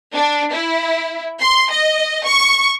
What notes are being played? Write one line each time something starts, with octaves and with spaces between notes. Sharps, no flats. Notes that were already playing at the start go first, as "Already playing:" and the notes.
D4
E4
C6
D#5
C#6